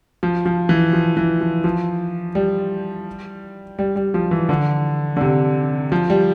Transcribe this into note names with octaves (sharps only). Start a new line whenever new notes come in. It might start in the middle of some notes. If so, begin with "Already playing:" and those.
F3
F3
E3
F3
E3
F3
F3
G3
G3
G3
F3
E3
D3
D3
C3
F3
G3